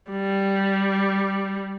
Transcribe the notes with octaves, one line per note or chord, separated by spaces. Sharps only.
G3